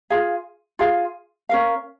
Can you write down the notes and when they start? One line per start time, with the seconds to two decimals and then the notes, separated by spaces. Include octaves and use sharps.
0.10 F4 G#4 F5
0.79 F4 G#4 F5
1.49 C#4 A#4 F5